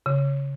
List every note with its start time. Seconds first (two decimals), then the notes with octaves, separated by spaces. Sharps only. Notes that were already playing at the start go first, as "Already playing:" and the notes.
0.06 C#3